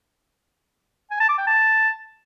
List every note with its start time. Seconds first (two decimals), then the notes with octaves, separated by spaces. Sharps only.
1.11 G#5
1.20 A5
1.29 D6
1.38 G5
1.47 A5